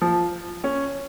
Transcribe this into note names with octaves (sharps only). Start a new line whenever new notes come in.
F3
C#4